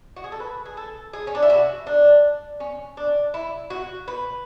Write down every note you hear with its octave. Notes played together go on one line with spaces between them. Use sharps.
F#4
G#4
A4
B4
G#4
A4
G#4
C#4
D4
E4
F#4
D4
C#4
D4
E4
F#4
B4